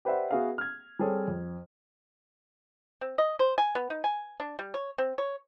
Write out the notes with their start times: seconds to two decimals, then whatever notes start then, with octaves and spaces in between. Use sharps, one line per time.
0.05 G4 B4 C5 D5 E5 F#5
0.31 B3 F#4 G#4 E5 F5
0.58 F6 G#6
0.99 G3 C4 G#4 A4 C#5
1.28 F2
3.01 C4
3.18 D#5
3.39 C5
3.58 G#5
3.75 B3
3.90 D#4
4.04 G#5
4.40 D4
4.59 G3
4.74 C#5
4.98 C4
5.18 C#5